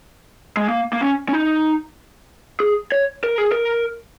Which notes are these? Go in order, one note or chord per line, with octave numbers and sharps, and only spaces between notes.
G#3
A#3
A#3
C#4
C#4
D#4
G#4
C#5
A#4
G#4
A#4